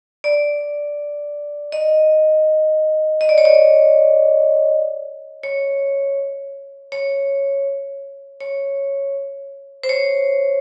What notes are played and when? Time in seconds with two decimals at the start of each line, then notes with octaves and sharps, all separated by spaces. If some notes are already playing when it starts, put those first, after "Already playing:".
0.24 D5
1.72 D#5
3.21 D#5
3.29 D5
3.38 C#5
3.45 D5
5.43 C#5
6.92 C#5
8.40 C#5
9.83 C5
9.89 C#5